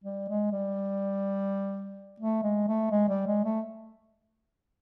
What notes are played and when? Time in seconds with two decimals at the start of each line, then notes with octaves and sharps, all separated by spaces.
0.04 G3
0.29 G#3
0.52 G3
2.20 A3
2.43 G#3
2.68 A3
2.91 G#3
3.09 G3
3.27 G#3
3.45 A3